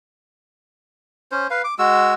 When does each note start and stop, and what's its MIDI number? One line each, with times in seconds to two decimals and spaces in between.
1.32 1.47 61
1.32 1.47 72
1.50 1.62 71
1.50 1.62 77
1.64 1.74 86
1.79 2.14 56
1.79 2.14 66
1.79 2.14 88